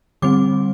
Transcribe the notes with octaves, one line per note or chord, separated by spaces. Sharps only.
D3 G3 C4 D6